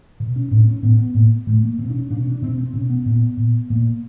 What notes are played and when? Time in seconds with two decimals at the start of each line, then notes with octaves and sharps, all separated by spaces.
0.20 B2
0.36 C#4
0.51 A2 C4
0.68 C#4
0.83 A2 B3
0.99 B3
1.14 A2 A#3
1.47 A2 A3
1.63 A#3
1.78 B2 C4
1.90 D4
1.95 C#4
2.10 B2 D4
2.21 C#4
2.30 D4
2.42 B2 C4
2.58 C4
2.74 B2 C#4
2.90 B3
3.06 A#2
3.37 A#2
3.70 A#2 A#3